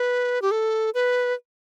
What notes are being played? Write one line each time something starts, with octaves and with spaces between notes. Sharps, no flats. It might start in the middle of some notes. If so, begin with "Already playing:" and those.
Already playing: B4
G4
A4
B4